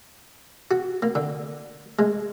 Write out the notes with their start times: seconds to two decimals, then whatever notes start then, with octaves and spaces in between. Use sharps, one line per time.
0.71 F#4
1.02 A#3
1.15 D3
1.99 G#3